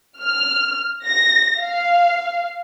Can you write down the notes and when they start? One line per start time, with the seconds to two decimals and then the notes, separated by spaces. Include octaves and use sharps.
0.21 F6
1.05 A#6
1.59 F5